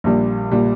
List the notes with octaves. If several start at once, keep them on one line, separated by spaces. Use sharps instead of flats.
A#1 A#2 G3
A#2 G3